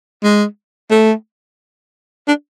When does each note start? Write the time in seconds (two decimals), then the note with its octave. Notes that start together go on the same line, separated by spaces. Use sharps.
0.23 G#3
0.91 A3
2.28 D4